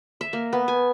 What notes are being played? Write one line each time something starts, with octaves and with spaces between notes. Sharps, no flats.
E5
A#3
B3
G#5